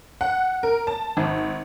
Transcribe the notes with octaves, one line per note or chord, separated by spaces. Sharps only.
F#5
A#4
A5
G#1